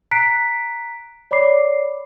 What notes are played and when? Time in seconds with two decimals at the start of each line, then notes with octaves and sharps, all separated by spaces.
0.11 A#5 F#6 B6 C7 D7
1.31 C#5 D5 B5 D6 C7